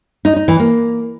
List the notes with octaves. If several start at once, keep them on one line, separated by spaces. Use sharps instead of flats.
D#4
D#4
E3
A#3